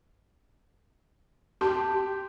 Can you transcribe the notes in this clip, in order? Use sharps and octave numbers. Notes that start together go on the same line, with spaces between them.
G4 A5 C6